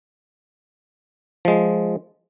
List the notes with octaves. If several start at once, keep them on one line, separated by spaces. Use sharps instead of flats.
F3 G#3